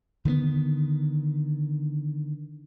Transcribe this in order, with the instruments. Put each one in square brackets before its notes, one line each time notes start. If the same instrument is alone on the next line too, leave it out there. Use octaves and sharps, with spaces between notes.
[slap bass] D3 D#3 G#3 B3